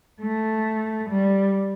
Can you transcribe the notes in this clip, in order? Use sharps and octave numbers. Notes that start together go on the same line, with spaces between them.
A3
G3